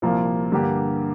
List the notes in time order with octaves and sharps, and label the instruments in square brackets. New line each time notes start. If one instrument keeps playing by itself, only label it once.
[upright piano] C2 A#2 F3 A#3 F4
G2 D3 G3 A#3 G4